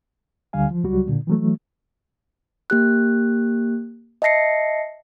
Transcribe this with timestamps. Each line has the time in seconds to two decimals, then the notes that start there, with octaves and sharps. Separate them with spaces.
0.53 D2 D3 G3 F5 G#5
0.71 F3
0.84 C#2 F#3 G3 F#4
1.07 A#2 D3
1.27 E3 F#3 A3
2.70 A#3 G4 F#6
4.22 D#5 E5 A5 A#6 C7 C#7